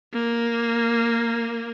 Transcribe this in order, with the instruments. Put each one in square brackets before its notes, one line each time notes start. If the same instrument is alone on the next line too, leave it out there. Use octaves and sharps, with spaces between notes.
[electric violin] A#3